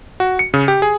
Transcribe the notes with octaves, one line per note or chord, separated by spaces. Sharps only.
F#4
C#7
C#3
G4
G#4